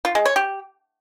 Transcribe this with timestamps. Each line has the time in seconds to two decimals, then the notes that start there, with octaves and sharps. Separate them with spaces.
0.05 F4
0.15 G#3
0.25 C#5
0.36 G4